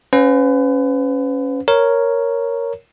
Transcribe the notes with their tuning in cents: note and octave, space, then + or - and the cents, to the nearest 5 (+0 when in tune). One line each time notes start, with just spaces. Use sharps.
C#4 -5 B4 +35 F#5 -40
A#4 +0 C#5 +0